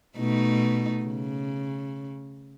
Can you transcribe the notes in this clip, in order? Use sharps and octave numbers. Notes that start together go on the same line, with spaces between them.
B2 A3 D#4
C#3